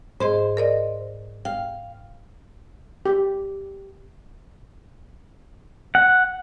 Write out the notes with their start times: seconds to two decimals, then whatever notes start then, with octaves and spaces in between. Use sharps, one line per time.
0.20 G#2 G#4 C5 D#5
0.57 A#4 D5 D#5
1.45 F5 G5
3.06 G4
5.95 F#5